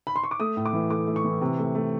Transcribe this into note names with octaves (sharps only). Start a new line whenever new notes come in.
B5
C6
C#6
D6
A3 D#6
A2
D6
E3
A3 D6
A3
C#6
E3
C3
A3
A3